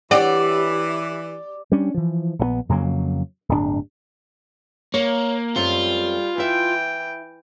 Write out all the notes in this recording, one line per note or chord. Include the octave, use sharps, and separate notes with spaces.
E3 G4 C#5 D5 F#5
G3 C#4 D4
E3 F3
A#1 F#3 B3
F2 C#3 F#3 A#3
D1 G1 C4 D4
A#3 C#5
F#2 G3 A3 C4 F4
E3 E4 E5 G5